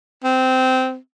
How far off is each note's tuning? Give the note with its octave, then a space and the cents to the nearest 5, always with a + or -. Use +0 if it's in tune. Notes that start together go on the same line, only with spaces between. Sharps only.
C4 -15